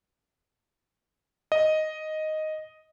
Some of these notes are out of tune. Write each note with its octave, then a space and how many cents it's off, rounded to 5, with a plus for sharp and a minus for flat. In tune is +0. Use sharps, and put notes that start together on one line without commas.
D#5 +0